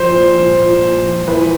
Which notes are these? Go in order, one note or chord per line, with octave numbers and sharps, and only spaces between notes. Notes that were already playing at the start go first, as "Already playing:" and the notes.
Already playing: F3 C5
A#2
F3
A#2
A#2
F3
E3 B4